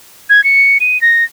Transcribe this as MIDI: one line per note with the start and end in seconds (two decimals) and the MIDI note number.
0.30 0.43 92
0.44 0.78 97
0.80 1.00 99
1.01 1.24 94